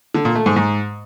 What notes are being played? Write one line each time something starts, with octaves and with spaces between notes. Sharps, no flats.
D3
A#2
A3
G#2
G#2